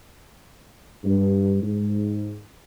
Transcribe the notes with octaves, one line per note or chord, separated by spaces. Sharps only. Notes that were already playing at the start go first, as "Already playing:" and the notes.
G2
G#2